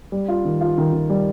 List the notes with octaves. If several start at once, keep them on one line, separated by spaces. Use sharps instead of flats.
G3
F4
D#3
F4
D#3
D#3
G3